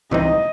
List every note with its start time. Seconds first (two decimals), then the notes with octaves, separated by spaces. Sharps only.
0.11 C2 C3 E3 C4 D#4 D#5